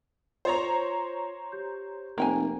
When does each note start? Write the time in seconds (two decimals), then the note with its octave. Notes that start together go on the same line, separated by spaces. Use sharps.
0.45 F4 C5 C#5 A#5 A6 F7
1.52 G4 G6
2.18 F1 A#3 G5 G#5